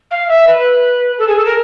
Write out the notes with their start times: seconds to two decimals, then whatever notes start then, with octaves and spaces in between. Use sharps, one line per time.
0.10 F5
0.28 E5
0.47 B4
1.18 A4
1.27 G#4
1.36 A4
1.45 A#4